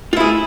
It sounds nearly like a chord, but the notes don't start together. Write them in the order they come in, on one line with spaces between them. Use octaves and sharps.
F4 E4 G#4